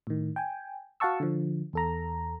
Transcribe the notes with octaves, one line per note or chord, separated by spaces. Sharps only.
A2 D#3
G5 G#5
F#4 F5 F#5 A5 C#6 E6
D3 F3
E2 A4 A#5